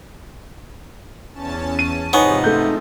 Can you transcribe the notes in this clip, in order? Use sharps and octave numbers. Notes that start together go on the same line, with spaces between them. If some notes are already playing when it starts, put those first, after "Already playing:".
E2 C#4 A5
D#7
G#2 C3 F3 B3 D#4 C#5 G#5 C#6
A3 G6